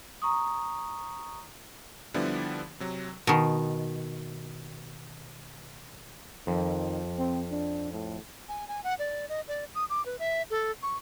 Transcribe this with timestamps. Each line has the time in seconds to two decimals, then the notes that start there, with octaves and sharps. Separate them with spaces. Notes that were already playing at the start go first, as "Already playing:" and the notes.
0.22 A#5 C#6 D#6
2.14 D3 F3 G3 B3 D4 E4
2.80 C3 F#3
3.27 B2 D#3
6.47 F2 D#3
7.18 C4
7.51 D4
7.92 A2
8.49 G#5
8.68 G#5
8.84 F#5
8.99 D5
9.29 D#5
9.48 D5
9.75 D#6
9.90 D6
10.06 B4
10.19 E5
10.50 A4
10.83 C#6